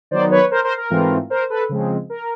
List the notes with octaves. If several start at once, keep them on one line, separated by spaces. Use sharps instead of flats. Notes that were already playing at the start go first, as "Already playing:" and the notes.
D#3 F#3 B3 D#4 C5 D5
B4 C#5
A#4 C5
A#4 C5
A#4
G#2 E3 A3 C4 F4
A#4 C5
A4 B4
C#3 F3 G#3 C4
A#4